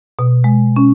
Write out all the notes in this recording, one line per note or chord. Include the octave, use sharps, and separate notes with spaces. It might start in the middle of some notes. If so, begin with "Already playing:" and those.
B2
G#3
C#4